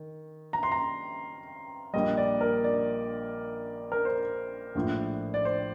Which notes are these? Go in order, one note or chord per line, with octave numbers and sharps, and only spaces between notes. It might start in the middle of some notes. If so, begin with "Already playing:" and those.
Already playing: D#3
A#5
C6
A#5
A#1 A#2 G3 D#5
D5
A#4
D5
A#4
C5
A#1 A2 F3
D5
C5